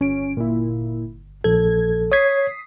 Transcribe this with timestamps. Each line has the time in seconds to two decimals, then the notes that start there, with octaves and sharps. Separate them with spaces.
0.01 G1 C#4 D7
0.37 A#2 E4
1.44 A#1 A4 G#6
2.12 C#5 D#6 G#6 B6 C7